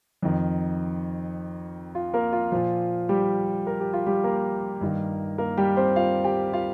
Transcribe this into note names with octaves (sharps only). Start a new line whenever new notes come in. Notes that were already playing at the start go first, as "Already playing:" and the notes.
F2 D#3
F4
A#3 A#4
F4
A#2 F3
G3 G4
A#4
G4
F4
G3 G4
A#3 A#4
G2 D#3
A#3 A#4
G3 G4
C4 C5
F4 F5
G4 G5
F4 F5